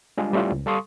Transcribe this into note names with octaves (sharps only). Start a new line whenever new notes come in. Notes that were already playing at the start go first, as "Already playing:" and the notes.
G3 G#3 D4 F4 G#4
G3 A3 C#4 E4 F4
C#2
G3 A4 F5 C6 C#6 D#6